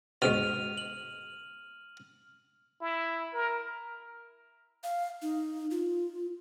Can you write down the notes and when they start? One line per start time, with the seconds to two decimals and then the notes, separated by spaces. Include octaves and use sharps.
0.22 D2 G#2 B2 F6 D#7 F7
0.78 F#7
2.81 E4
3.34 A#4
4.84 F5
5.22 D#4
5.71 F4